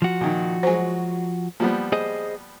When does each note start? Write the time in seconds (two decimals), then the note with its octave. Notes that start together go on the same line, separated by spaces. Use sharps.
0.02 F3 F#4
0.21 A#2 D#3
0.63 F#3 G#3 C5 G#5
1.60 F3 G3 A#3 B3
1.92 G#4 C5 D#5